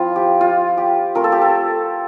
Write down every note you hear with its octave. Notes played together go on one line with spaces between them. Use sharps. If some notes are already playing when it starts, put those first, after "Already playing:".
Already playing: F3 C4 E4 F4
G4
F4
G4
A3 C4 F4 A#4
A4
G4
A4